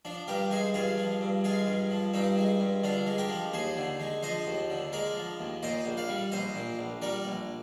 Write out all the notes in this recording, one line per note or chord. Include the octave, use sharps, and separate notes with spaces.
F3 D4
G2 G4 A#4
G#3 G#4 C5
G2 F4 G#4
F3
G2
G#3 F4 G#4
G2
F3
G2 C4 D#4
G#3
G2
D3 D4 F4
G#3
G4 A#4
F3
D#2 G#4 C5
D3
G#3
F3 C5 D#5
D#2
D3
G#3 A#4 D5
F3
D#2
A#2 C5 D#5
A#1
D5 F5
G3
A#1 C5 D#5
A#2
A#1
G3 A#4 D5
A#1